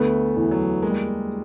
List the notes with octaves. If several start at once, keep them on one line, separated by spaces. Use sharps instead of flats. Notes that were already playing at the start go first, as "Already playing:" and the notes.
Already playing: D2 A3 B3
E2
F#3
G#3 A#3
G3